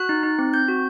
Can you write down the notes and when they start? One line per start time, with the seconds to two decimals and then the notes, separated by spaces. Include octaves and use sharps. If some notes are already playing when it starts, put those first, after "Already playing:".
Already playing: F#4 F#6
0.09 D#4
0.23 D#4
0.39 C4
0.54 C4 G6
0.68 F#4